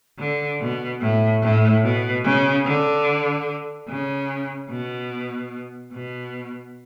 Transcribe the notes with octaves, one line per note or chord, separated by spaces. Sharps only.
D3
B2
A2
A2
B2
C#3
D3
C#3
B2
B2